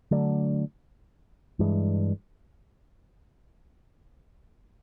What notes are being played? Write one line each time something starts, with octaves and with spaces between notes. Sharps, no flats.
D3 F#3 A3 D4
G2 E3 G#3